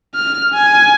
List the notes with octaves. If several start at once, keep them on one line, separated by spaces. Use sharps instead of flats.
F6
G#5